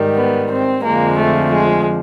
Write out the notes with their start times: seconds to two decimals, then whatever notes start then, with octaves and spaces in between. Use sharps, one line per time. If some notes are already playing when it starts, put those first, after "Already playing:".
Already playing: G#2 D#3 G3
0.16 B3
0.50 C4
0.83 F2 D3 F3 G#3 A#3
1.18 A3
1.52 G#3